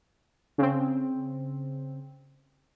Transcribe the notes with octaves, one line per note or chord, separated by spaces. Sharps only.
C#3 C4